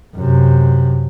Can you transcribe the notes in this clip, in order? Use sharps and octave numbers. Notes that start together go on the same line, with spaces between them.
F#2 C3